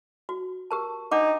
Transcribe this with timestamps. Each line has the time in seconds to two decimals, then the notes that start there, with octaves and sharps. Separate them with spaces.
0.29 F#4
0.71 G4 A#4 A5
1.12 D4 D#4 F#5 D6